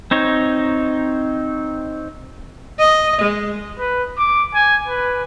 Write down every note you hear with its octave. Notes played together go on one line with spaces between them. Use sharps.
C4 D#4 C#5
D#5
G#3
B4
D6
G#5
B4